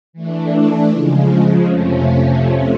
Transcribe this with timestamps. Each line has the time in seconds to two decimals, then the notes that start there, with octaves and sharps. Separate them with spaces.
0.13 E3 A3 D4
0.89 C#3 F3 G#3
1.66 F2 C3 F3 A3 C#4